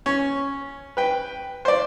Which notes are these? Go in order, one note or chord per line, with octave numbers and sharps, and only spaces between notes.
C#4
B4 G5
C5 D5